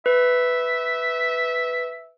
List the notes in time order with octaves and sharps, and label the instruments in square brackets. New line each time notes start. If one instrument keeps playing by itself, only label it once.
[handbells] B4 [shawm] E5